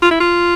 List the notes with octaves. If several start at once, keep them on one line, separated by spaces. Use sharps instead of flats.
F4
E4
F4